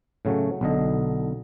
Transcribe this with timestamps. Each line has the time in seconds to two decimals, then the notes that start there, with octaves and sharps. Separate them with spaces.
0.25 A2 C#3 F#3 A3
0.61 B1 D3 D#5